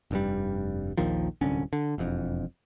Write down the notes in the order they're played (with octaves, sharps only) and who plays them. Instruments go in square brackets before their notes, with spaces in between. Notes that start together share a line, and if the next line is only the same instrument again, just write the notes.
[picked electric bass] F1 G2 G3
A#1 D#2 D#3 F3
D1 C2 D3 C#4
D3
E1 F2